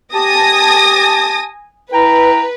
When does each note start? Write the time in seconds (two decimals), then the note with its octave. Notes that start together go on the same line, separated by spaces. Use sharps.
0.14 G4 G#5 A5 D#6 A#6
1.93 E4 B4 G5 A#5